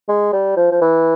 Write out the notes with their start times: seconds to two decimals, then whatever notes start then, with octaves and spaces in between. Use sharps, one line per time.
0.09 G#3
0.33 G3
0.57 F3
0.71 F3
0.81 E3